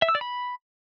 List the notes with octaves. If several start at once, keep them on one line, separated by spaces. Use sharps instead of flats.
E5
E6
D5
B5